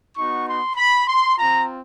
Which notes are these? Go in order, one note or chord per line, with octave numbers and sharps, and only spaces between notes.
B3 D#4 F#4 C#6
C6
B5
C6
C4 F4 A#5